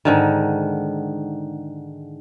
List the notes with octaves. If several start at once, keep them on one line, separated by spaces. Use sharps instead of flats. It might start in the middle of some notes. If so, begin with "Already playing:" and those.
G#2 D3 D#3